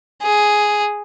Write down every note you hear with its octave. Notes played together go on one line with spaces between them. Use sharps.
G#4